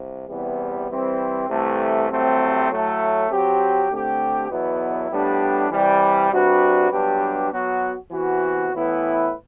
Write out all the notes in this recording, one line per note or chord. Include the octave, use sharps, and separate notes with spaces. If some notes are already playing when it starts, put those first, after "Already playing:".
Already playing: C2
E2 C3 E3 G3 B3
E3 G3 C4
C2 C3 E3 A3
C2 C3 F#3 A3 C4
A2 F#3 A3
F#3 C4 G4
D3 A3 C4 G4
E2 B2 F#3 B3 E4
A2 G3 B3 D4 G4
C3 E3 G3
C3 G3 D4 F#4 B4
G2 F#3 B3 D4 G4
F#3 B3 F#4
C3 E3 B3 F#4
A2 E3 B3 E4 B4